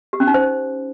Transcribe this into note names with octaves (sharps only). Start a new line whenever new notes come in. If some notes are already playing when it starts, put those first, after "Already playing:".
G4
C#4
D#4
C5